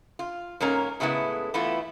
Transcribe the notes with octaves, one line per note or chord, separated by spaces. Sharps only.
F4
G#2 A#3 C#4 A#4
A2 C#3 G#3 B3 E4
E3 A3 B3 E4 F4